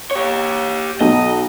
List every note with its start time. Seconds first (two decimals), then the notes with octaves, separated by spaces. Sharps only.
0.11 G4 C#5
1.01 B1 D#5